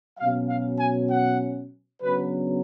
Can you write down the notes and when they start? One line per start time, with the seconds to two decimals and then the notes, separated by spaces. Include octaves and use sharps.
0.18 B2 F#3 C#4 F5
0.49 F5
0.79 G#5
1.11 F#5
2.02 C#3 F#3 B3 D4 B4